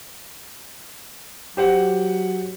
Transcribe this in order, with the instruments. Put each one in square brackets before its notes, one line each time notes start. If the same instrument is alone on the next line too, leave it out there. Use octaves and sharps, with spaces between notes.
[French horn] F#3 [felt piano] G4 C5 F#5